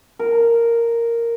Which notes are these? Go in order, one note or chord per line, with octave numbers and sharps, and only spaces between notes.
A#4